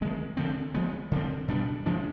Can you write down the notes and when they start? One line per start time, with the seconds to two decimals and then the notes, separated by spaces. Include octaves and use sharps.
0.01 D#3 G#3 C4
0.37 D3 F3 C4
0.74 F3 G#3 B3
1.12 D3 F3 C4
1.48 B2 G3 D4
1.86 F3 G#3 D4